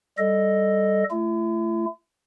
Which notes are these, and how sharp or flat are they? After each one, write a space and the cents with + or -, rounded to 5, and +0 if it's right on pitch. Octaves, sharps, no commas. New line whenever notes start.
G3 +0 A4 +0 D#5 +0
A3 +0 E4 +45